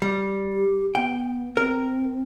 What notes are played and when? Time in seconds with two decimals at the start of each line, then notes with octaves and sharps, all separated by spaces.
0.02 G3
0.53 G4
0.95 B3 G5
1.57 C4 A#4